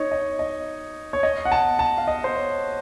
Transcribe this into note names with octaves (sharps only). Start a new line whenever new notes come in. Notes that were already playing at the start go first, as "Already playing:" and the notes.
Already playing: D#4 C#5
D#5
D#5
C#5
D#5
F#5
A5
A5
F5
D#5
C5
C#5